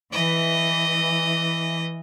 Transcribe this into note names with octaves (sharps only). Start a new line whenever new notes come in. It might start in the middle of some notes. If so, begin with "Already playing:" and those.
E3 D#5